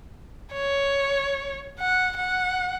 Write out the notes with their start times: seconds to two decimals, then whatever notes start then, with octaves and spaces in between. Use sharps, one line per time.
0.54 C#5
1.80 F#5
2.17 F#5